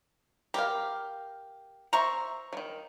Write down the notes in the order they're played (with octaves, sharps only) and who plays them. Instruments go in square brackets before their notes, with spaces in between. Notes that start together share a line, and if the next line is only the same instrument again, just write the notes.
[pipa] G4 [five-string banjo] A#4 F5
[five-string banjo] C5 E5 [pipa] A#5 C#6
[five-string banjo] D#3 F#3